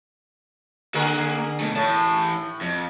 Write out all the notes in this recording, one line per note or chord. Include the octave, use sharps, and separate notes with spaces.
D3 A#3 G#4 A#4 F#5
B2 A3
A2 E3 A5
F2